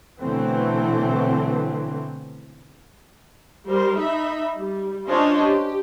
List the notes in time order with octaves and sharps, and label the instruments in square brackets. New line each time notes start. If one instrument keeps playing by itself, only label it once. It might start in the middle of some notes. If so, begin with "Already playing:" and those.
[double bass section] B2 D3 E3 F#3 A3 C4
[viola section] G3 A#4 C5
D#4 E5 B5
G3
C#4 D4 F4 C5 C#5 D#5
G4